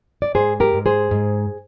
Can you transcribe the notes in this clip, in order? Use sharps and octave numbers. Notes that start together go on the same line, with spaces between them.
D5
G#2 G#4 C5
G4 A#4
G#2
G#4 C5
G#2